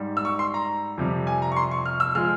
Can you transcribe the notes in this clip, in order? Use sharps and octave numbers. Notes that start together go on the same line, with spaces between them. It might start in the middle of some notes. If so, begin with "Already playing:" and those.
Already playing: G#2 G3
E6
C#6
C6
A#5
F2 C3 G3
G#5
A#5
C#6
C6
C#6
F6
E6
F3 G#3 F6